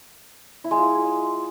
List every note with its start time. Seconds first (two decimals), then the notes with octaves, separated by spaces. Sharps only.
0.64 E4
0.71 G#3
0.78 F4